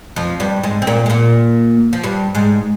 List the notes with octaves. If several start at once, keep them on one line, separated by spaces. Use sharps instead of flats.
F2 F3
G2 G3
G#2 G#3
C4
A#2 A#3
G#3
A#2 A#3
F3
G2 G3
G#2 G#3